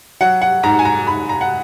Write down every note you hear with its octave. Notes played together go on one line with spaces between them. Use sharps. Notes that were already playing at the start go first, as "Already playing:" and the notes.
F#3 F#5
F#5
G#2 A#5
G#5
A#5
G#2 B5
A#5
F#5